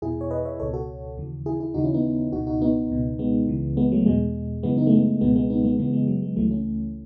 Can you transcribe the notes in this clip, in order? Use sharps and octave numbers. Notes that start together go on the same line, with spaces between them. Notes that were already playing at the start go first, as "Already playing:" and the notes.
E2 B2 E4 G#4
C#5
B4 D#5
C#5 E5
C#2 B2 A4 C#5
F#4 A4
D#2 C#3 E3
E4 G#4
E4 G#4
D#2 C#3 E3 D#4 F#4
C#4 E4
B3 D#4
C#2 B2 D#4 F#4
D#4 F#4
B3 D#4
C#2 B2
G#3 B3
C#2 C#3 E3
G#3 B3
F#3 A3
E2 B2 G#3
F#2 C#3 E3 G#3 B3
B3 D#4
A3
G#3 B3
C#2 B2 G#3 B3
G#3 B3
B3 D#4
G#3 B3
F#2 C#3 E3 G#3 B3
G#3
F#3
G#3
C#2 C#3 E3 F#3 A3
A3 C#4